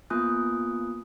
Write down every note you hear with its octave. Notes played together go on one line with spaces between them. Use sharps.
A#3 B3 F4 G#5 D#6 F#6